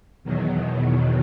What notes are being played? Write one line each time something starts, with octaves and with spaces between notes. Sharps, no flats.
E2 B2 D#3 F#3